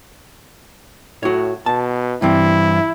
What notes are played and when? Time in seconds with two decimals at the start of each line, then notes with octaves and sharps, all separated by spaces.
1.23 A2 F#4 C#5
1.66 B2 A5
2.22 G2 E3 C4 E4